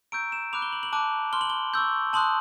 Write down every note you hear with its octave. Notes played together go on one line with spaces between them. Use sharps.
A#5 C#6 E6 G6 D7
E7
B5 D6 F#6 F7
G7
F#7
F#7
A5 D6 F#6
C6 F6 G7
F#7
G7
C#6 E6 G6
A5 C6 D#6 F#6 F#7